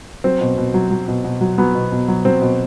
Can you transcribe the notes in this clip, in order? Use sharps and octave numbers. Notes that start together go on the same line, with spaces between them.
F#3 C4
B2
B2
F#3
F#3
B2
B2
F#3
F#3 B3
B2
B2
F#3
F#3 C4
B2